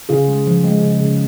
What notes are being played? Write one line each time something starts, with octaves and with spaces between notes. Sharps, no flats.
C#3 F4 G#4
G#3
F3
G#3
C#3
C#3